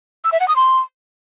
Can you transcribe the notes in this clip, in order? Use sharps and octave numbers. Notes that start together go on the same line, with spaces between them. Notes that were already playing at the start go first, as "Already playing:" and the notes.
E6
E5
F#5
D#6
C6